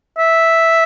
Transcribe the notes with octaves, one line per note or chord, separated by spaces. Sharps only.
E5